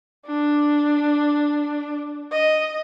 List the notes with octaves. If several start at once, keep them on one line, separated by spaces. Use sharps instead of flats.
D4
D#5